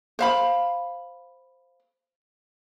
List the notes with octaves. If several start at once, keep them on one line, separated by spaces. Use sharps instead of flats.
C5 F5 B5